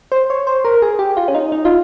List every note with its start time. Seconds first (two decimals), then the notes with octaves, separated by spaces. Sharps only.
0.12 C5
0.30 C#5
0.47 C5
0.65 A#4
0.82 G#4
0.99 G4
1.17 F4
1.28 C#4
1.35 D#4
1.52 D#4
1.65 F4